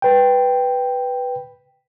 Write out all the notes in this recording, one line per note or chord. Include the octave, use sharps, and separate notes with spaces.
B4 G5